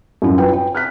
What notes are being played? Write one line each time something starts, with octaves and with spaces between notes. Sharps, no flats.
F#2 E4 F4
B4 G5
G5
F6 F#6 B6